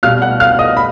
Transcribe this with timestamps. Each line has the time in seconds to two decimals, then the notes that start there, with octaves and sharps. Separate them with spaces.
0.03 B2 G3 F5 F6
0.22 F#5 F#6
0.40 F5 F6
0.59 D#5 D#6
0.77 B5